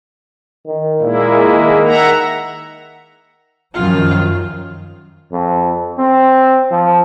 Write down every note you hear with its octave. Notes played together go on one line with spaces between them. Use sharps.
D#3
A#2 G#3 A#3 E4
D#3
E5 F#5 A#5
F#2 D#3 F3 F4
F2
C4
F3